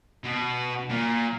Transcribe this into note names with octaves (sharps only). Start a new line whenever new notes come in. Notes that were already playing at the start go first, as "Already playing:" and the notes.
B2
A#2